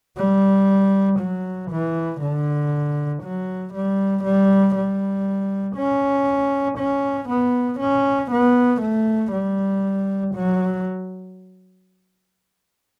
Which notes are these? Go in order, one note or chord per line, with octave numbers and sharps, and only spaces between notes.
G3
F#3
E3
D3
F#3
G3
G3
G3
C#4
C#4
B3
C#4
B3
A3
G3
F#3